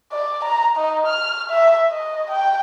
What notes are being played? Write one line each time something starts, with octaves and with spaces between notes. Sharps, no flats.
D5
A#5
D#4
F6
E5
D#5
G5